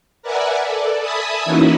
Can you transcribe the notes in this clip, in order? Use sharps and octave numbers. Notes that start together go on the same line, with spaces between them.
A#4 B4 D5 E5 F#5 G#5
A4 D5
E5 G#5 A5 B5 D#6
E3 A#3 C#4 D#4 E4 F#4